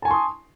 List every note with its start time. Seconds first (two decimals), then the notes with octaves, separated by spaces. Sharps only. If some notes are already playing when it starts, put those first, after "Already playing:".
0.02 A5
0.05 G#5
0.08 C#6
0.11 C6
0.13 D#6